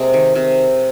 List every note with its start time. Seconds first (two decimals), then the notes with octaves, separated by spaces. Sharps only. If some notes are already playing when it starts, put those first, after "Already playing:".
Already playing: C3 G#3 A#3
0.14 D#3
0.35 C3